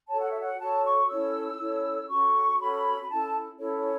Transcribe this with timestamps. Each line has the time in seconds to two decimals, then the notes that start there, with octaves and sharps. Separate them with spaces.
0.09 F#4 A4 C#5 A5
0.19 F#5
0.30 E5
0.41 F#5
0.59 F#4 A4 C#5 A5
0.83 C#6
1.09 C#4 E4 A4 C#5 E6
1.59 C#4 E4 A4 C#5
2.09 C#4 F#4 A4 C#6
2.58 C#4 F#4 A4 B5
3.02 B5
3.08 C#4 E4 A4 A5
3.58 C#4 E4 A4 C#5
3.79 C#5